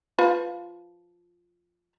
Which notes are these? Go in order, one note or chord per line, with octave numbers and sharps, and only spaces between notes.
F3 F4 B4